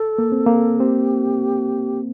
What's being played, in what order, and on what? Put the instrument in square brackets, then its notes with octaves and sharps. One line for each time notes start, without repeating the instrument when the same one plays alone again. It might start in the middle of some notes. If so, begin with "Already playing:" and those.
Already playing: [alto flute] A4
[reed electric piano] A#3
C4
A#3
[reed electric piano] C4 [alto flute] G4